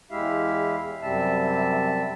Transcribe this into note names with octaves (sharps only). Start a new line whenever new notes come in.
E2 G#3 E4 G4 E5 F5
F#2 C3 G3 C4 E5 A5